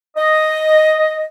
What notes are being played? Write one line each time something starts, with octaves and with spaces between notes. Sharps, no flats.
D#5